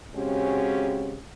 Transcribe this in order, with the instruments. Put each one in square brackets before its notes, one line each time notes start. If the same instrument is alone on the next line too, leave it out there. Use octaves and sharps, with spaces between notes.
[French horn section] C#3 G#3 C4 C#4 F#4 G4